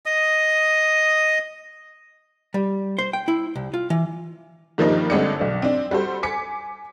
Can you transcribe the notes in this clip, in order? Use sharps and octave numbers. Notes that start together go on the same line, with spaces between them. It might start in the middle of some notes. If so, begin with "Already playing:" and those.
D#5 D#6
G3
C5
G5
E4
C2
F4
E3
G2 D#3 F3 G3 A#3 D#4
G1 D3 G#3 C4 D5 C#7
B1 D4
C4 D4
G3 F#4 A4 C5
G#5 D6 B6 C#7